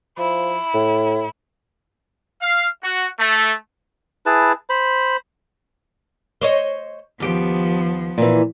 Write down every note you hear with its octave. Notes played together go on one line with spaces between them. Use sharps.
F3 E4
A2
F5
F#4
A3
E4 G#4 B4 A5
C5 B5
C5 C#5 D#5
D#2 F3 B3 G4
A#2 E3